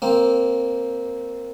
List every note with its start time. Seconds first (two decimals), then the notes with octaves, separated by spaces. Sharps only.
0.02 A#3 C4